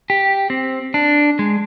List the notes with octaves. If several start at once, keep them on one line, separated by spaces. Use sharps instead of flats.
G4
C4
D4
G#3